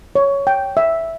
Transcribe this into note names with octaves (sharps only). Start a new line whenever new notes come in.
C#5
G5
E5